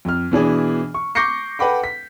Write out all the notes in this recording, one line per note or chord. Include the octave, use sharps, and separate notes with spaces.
F2 F6
B2 E3 D4 G#4
C#6
C#6 D6 G6 A#6 C7 C#7
A4 B4 F#5 G5 B5 D6
B6